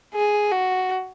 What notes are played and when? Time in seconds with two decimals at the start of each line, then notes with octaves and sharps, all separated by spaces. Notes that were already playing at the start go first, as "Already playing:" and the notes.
0.14 G#4
0.52 F#4